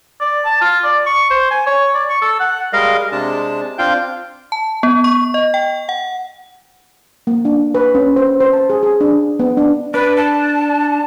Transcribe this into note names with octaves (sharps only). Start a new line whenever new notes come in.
D5
A5
F4
D5
C#6
C5
G#5
C#5
D5
C#6
A4
F#5
G3 G#3 A#4 D#5 F5
C3 G#3 D4 A5
C4 D4 F4 F5 G5 G6
A5
B3
C#6
D#5
G5
F#5
A#3
D4
B4
C#4
C5
C5
A5
G#4
G#4
D4
B3
D4
D4 B4
A5